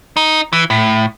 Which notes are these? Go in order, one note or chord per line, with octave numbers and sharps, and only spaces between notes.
D#4
E3
A2